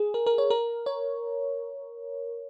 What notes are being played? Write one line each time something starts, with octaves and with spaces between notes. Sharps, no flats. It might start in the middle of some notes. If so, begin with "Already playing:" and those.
Already playing: G#4
A#4
A#4
C#5
A#4
C#5